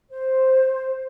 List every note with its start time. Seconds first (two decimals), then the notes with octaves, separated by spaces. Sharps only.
0.10 C5